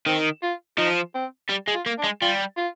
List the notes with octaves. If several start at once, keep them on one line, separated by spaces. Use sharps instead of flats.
D#3 C4
F4
F3 D#4
C4
G3
G#3
F4
A#3
D4
G#3
G3 F4
F4